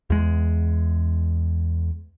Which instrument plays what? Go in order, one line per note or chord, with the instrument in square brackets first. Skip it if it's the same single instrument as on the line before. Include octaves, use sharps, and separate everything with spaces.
[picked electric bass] E2 G#3